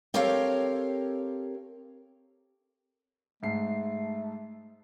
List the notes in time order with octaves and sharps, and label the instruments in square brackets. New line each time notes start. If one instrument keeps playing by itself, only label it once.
[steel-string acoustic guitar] C4 G4 A4 A#4 C#5 F5
[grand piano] G#2 C7 [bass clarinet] A3